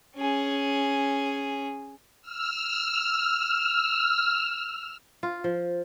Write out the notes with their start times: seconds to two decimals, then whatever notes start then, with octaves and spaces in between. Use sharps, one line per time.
0.16 C#4 G#4
2.22 E6 F6
5.23 F4
5.44 F3